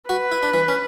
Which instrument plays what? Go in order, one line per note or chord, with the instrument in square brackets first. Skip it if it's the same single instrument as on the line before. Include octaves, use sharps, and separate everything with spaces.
[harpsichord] F#4 [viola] B4
[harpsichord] E4
D4
E3
C#4